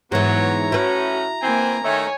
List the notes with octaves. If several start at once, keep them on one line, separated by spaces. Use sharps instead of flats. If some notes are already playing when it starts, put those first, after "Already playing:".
G#2 E3 F#3 B3 C#5 A#5
A2 A3 C#4 E4 F#4 B4
E3 A#3 C4 G#5
D#3 A3 C#5 G#5